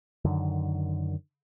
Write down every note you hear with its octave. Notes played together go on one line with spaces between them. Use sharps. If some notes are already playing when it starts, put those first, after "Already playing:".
F#2 D3 D#3